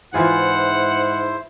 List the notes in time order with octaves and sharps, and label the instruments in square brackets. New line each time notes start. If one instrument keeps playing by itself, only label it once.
[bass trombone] G#2 [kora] E3 F4 G#4 [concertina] E4 C5 [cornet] F#5